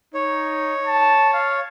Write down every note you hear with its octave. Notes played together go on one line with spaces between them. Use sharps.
D#4 C#5
A5
F5